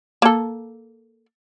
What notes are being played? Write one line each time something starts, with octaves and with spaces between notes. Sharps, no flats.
A#3 A4